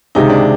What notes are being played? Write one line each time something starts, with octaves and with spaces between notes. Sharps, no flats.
C#2 C3 D#3 G#3 D#4
D4